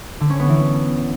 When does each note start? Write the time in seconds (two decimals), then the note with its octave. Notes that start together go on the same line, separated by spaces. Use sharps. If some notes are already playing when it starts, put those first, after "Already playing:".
0.20 D3
0.30 C#4
0.40 B3
0.49 E3